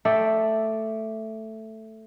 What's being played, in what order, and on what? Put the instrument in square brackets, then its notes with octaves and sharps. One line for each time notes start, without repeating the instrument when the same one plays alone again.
[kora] A3 D5 E5 G5